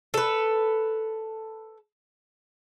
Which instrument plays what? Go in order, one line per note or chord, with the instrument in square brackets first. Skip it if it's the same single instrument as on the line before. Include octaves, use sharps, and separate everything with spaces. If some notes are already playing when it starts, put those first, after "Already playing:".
[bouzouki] A4 B4